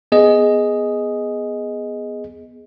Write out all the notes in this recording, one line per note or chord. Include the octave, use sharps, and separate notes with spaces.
B3 G#4 D#5